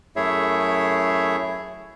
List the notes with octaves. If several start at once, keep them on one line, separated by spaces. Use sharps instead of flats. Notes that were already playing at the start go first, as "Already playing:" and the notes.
F#2 A3 E4 G#4 C#5 E5